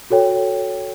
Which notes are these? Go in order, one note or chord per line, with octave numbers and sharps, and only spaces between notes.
F#4 A4 C#5 G5